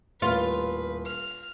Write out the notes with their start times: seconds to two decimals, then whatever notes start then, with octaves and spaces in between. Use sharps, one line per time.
0.22 D#1 A2 F4 B4 F5
1.06 F6